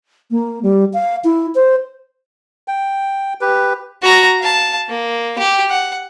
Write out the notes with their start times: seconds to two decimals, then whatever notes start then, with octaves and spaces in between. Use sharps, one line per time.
0.31 A#3
0.63 G3
0.93 F5
1.24 E4
1.55 C5
2.68 G5
3.41 G4 B4
4.02 F#4 A#5
4.40 F5 A5
4.89 A#3
5.38 G4
5.70 F#5